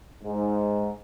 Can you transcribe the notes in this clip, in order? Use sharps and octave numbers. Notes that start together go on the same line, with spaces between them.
G#2